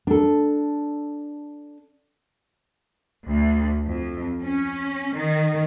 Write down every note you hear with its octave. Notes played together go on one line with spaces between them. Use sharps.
D4 A4
D2
F2
C#4
D#3